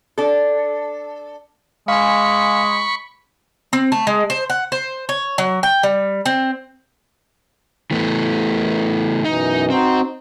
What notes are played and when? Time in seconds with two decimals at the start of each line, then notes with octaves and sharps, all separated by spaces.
0.18 D4 A4
1.88 G#3 F5 G#5 B5 C#6
3.73 C4
3.92 A3
4.07 G#3
4.30 C5
4.50 F#5
4.72 C5
5.09 C#5
5.38 F#3
5.63 G5
5.83 G3
6.25 C4
7.91 E3 A3 B3
9.25 F#2 B2 E3 D#4
9.70 C4 D#4 F#4 C5